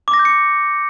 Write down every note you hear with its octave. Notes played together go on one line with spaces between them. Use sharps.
D6
A#6
G6
C#7